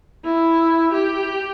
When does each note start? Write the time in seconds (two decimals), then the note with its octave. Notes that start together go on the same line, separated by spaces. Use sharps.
0.24 E4
0.93 G4